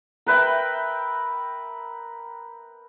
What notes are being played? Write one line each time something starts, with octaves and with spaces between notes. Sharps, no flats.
A#4 B4 E5 G5